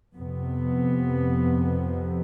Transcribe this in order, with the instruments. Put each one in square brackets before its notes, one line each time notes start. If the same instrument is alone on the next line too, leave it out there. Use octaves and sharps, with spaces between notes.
[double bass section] F2 C3 B3